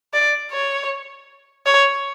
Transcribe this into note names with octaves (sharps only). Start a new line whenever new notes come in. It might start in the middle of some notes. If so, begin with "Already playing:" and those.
D5
C#5
C#5